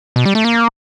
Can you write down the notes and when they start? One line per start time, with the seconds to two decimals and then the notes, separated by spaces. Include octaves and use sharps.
0.16 B2
0.25 G3
0.35 A3
0.45 A#3